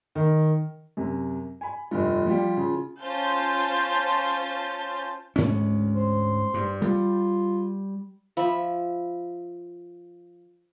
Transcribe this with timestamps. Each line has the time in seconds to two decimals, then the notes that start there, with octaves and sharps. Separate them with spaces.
0.15 D#3
0.97 F#2 C3
1.61 G#5 B5
1.91 F1 G2 F4
2.26 F3 G3 G4
2.57 C#3
3.01 C#4 F4 C5 A5 G6
5.36 D2 G#2 C#4
5.95 C5
6.54 G2
6.82 G3 F4
8.37 F3 E5 B5